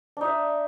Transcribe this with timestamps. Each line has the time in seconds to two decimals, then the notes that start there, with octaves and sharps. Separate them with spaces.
0.17 D4
0.21 D#4
0.25 E5